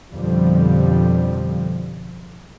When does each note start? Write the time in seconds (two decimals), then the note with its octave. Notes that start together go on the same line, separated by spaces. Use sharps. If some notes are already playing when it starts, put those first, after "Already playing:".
0.14 F2 B2 D3 F3 G3